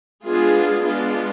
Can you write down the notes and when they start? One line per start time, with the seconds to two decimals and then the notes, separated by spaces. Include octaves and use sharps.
0.25 G#3 B3 D4 F4 G#4
0.84 G#3 B3 D4 F4